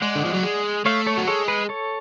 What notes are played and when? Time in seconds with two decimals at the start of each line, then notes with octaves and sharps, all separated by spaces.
0.02 G#3 D5 F#5
0.15 D3
0.25 F3
0.34 F#3
0.44 G#3
0.85 A3 C#5 F5
1.06 A4 C#5
1.17 F#3
1.27 G#3 A4 C#5
1.48 G#4 B4
1.69 A4 C#5